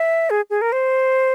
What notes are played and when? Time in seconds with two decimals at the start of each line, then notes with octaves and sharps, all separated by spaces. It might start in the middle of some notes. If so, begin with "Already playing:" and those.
Already playing: E5
0.30 G#4
0.50 G#4
0.62 A#4
0.72 C5